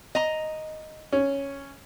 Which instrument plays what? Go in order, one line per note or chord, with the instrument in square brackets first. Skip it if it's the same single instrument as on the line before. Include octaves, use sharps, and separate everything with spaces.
[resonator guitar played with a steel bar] D#5 A#5
[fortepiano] C#4